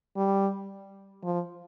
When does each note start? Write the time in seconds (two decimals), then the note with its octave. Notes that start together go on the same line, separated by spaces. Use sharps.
0.16 G3
1.23 F3